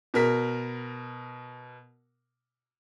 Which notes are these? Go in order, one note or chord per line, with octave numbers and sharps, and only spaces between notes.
B2 A#4 B6